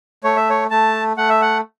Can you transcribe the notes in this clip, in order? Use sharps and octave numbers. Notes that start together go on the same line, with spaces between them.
A3 C#5
E5
C#5
A3 A5
A3 F#5
E5
F#5